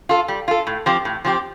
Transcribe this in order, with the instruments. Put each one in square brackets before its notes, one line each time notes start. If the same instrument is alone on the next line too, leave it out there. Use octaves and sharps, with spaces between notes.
[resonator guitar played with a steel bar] F4 A4
G3
F4 A4
A2
F3 C4 G4
A2
F3 C4 G4